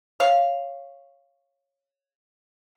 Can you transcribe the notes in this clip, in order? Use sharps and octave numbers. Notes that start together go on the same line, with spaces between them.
C#5 F5